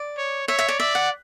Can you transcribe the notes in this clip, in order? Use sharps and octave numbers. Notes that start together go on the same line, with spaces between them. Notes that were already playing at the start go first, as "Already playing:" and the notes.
Already playing: D5
C#5
C#5 E5
E5
D5
D5 E5
F#5